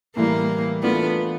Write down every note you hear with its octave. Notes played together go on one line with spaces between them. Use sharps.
A2 E3 G3 A#3
E3 A3 B3 D4 F4